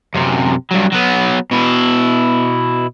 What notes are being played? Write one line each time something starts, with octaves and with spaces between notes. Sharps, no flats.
F#2 C3
G2 F#3
F#3 B3
B2 E4